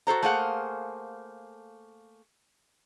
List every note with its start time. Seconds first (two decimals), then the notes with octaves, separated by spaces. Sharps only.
0.07 F#4 A4 C5 A#5
0.22 A3 A#3 G#4 C5 F5 F#5